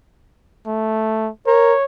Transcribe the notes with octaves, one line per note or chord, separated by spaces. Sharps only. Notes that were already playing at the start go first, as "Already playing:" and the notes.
A3
A#4 C#5